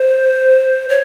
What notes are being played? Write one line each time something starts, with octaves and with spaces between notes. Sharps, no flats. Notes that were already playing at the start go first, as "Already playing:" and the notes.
Already playing: C5
C#5